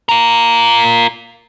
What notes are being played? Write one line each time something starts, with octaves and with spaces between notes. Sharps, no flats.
F4 A#4